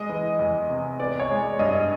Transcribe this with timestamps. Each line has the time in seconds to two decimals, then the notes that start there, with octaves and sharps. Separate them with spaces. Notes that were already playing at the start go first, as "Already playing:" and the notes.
Already playing: G#3 D#5
0.09 E3
0.39 E2
0.69 C3
1.00 B3 D5
1.20 C#5
1.29 G#3
1.59 G2 D#5